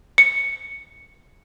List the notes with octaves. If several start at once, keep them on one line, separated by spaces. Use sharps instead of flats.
C#7